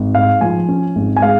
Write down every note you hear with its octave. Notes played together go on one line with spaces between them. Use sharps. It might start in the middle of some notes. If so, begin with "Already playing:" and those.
Already playing: G#1
G#2 F5
F3 G#5
C#4
G#1
G#5
G#3 F5